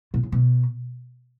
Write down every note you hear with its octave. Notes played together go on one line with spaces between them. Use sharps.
B2
C#3
B2